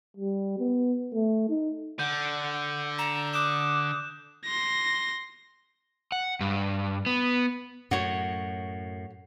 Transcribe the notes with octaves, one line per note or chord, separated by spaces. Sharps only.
G3
B3
A3
D#4
D3 F#5 G6
A#5 E7
D6 D#6 F#6 E7
C6 A#6
F#5
G2
B3
F#2 A2 F#4 C#5